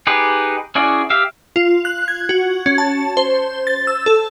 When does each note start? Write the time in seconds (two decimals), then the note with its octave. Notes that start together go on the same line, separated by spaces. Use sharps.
0.07 D#4 G4 G#4 B4
0.75 C#4 E4 F#4 G#4 D5
1.10 G4 E5 F5
1.56 F4
1.85 F#6
2.08 G#6
2.29 F#4
2.66 C#4
2.78 A5
3.17 C5
3.67 A6
3.87 E6
4.06 A4